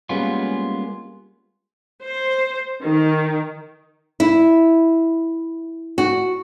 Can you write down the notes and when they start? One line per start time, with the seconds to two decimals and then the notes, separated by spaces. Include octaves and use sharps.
0.09 G3 G#3 A#3 B3 C#4 F4
2.01 C5
2.84 D#3
4.20 E4
5.98 F#4